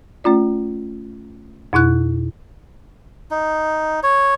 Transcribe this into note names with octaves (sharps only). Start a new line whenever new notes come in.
A3 C#4 F4 D5
F2 B2 E4 F#6
D#4
C#5